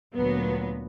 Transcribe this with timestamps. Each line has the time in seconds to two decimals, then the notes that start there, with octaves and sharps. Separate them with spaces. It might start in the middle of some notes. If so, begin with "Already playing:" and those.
0.15 D2 A#2 F#3 B3